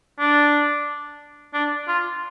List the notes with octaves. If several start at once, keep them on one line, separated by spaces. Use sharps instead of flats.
D4
D4
F4